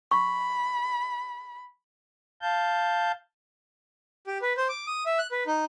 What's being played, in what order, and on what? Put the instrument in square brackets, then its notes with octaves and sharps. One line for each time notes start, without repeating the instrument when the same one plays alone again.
[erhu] B5 [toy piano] C#6
[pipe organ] F5 A5 G6
[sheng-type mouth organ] G4
B4
C5
D6
D#6
E5
F#6
B4
D#4